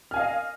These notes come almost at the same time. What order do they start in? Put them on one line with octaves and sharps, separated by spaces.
F6 G#5 F5 D#5